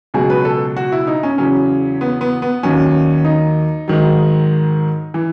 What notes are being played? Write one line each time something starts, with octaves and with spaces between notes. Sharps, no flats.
C#2 B2 F#3 G#4
B4
A4
F#4
E4
D#4
C#4
E2 C#3 F#3 C#4
B3
B3
B3
D#2 D#3 F#3 C#4
D#4
G#2 D#3 F#3
E3